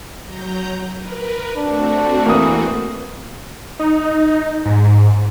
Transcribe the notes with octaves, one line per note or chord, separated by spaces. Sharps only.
F#3 A#5 G6
A#4 B4
A3 C4 D4 F#4
E3 A#3 D#6
D#4
G#2